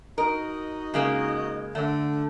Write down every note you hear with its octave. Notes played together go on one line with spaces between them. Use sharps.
D#4 F#4 A#4 D#5
C#3 G#3 A#3
D3 A3